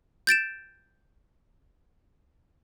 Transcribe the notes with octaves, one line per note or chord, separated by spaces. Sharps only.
G6 A6 D7 E7